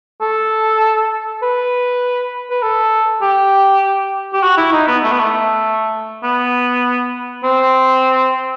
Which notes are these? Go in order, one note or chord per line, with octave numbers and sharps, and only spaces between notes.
A4
B4
B4
A4
G4
G4
F#4
E4
D#4
B3
A3
B3
A3
B3
C4